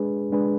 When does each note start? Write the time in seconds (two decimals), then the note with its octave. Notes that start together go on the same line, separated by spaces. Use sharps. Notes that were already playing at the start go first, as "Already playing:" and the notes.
Already playing: G#3 D4 G#4 B4
0.32 G#3 D4 G#4 B4